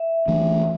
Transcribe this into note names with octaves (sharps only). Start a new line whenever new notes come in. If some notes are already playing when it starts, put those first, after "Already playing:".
Already playing: E5
E3 A3 D4